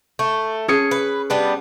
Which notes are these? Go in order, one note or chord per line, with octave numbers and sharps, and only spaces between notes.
A3
C#4 G#4 C#7
B4
G3 B3 D4